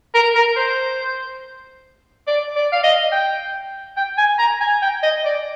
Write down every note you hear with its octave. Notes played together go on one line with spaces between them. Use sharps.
A#4
A#4
C5
D5
D5
F5
D#5
G5
G5
G#5
A#5
G#5
G5
D#5
D5